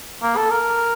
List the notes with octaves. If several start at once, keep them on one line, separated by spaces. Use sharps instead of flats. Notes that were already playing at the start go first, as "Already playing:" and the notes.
A#3
A4
A#4